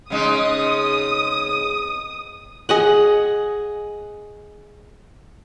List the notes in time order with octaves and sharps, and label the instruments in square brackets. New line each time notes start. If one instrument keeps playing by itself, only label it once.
[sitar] C#3 G#3 D#4 [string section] D#6
[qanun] G#4 D#5 F#5